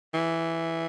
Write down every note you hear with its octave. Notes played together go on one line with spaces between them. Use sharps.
E3